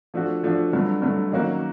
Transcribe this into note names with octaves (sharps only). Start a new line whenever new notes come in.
F3 A3 D4 F#4
F3 A3 D4 F#4
G2 D3 F#3 A3
G2 D3 F#3 A3
D#3 F#3 A#3 C#4 F#4